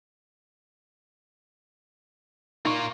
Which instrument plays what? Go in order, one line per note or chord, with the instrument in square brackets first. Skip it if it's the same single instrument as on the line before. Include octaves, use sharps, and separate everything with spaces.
[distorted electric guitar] A#3 F4 [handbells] D#4 C#6